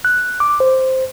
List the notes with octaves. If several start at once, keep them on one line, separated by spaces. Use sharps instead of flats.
F#6
D6
C5